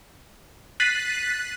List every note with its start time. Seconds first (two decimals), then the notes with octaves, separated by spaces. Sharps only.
0.80 F#6 A6 B6 C7 D#7 F#7